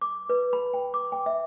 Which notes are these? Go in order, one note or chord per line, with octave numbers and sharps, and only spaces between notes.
D6
B4
B5
G5
D6
G5
E5